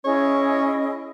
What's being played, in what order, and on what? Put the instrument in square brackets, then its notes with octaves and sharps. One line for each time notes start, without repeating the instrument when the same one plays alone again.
[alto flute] C#4 [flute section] E4 G#4 D#5 [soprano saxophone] C#5